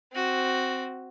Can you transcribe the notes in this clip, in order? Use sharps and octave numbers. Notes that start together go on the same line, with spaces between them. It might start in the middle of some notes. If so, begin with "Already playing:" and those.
C4 F#4